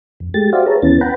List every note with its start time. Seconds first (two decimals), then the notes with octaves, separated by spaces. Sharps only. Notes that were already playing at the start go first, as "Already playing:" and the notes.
0.20 F2
0.34 G#3 A3 G4 A6
0.53 F#4 G4 C5 D5 E5 F5
0.66 G#4 B4 C#5 A5 A#5
0.82 D#2 E3 B3 C#4 A6
1.01 B4 F#5 G5 A#5 B5